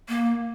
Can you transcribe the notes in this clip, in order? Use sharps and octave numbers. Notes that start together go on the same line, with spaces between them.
A#3